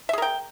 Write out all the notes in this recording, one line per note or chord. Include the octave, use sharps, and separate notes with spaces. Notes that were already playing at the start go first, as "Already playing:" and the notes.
G#4 A#4 E5 G5